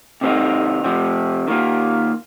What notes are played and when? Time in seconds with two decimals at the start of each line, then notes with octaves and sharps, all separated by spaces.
0.21 C3 D#3 C4 D#4
0.84 C3 F3 C4
1.48 D#3 A#3 F4